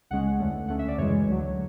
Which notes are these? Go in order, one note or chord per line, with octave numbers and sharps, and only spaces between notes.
C#2 C#3 G#3 C#4 F#5
E2 D3 A3
D2 D3 A3 C#4 F#5
E5
D5
F#2 C#3 E3 G#3 C#5
D2 D3 F#3